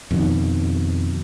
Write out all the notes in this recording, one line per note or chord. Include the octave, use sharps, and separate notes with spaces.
F2 B2 D#3